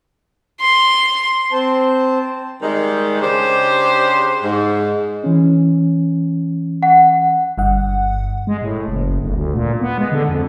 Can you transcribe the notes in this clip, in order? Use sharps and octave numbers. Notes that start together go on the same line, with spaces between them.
C6
C4 C5 A5
D#3 G3 G#3
C#3 D4 G4 C5
G#2
E3 C#4
F#5
G1 G2 F#5
G#3
A2
F#1
G1
D2
A#2
B3
G#3
D3
F2